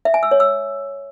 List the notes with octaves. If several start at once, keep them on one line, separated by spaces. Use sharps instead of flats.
E5
G#5
E6
C#5
E6